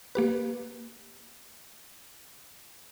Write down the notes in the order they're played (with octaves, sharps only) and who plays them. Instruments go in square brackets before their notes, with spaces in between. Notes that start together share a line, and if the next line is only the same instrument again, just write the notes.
[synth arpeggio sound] A#3 G4 B4